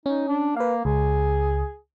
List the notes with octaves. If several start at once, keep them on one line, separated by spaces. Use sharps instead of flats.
C#4 D#4
D4
A#3 B4 F5
C#2 G#4